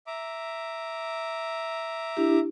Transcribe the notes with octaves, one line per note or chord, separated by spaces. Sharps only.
E5 A#5 D6
D4 E4 G4